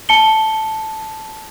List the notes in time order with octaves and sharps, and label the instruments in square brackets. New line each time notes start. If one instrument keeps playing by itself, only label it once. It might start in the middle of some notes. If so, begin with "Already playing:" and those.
[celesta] A5 C#7 G7